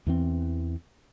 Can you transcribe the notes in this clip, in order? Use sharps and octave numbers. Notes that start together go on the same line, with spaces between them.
E2 E3 C4